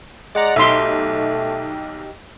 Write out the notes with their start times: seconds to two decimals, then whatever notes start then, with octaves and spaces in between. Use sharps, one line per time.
0.35 G#3 D5 F#5 A#5
0.56 B1 A3 D#4 G4 E5 C6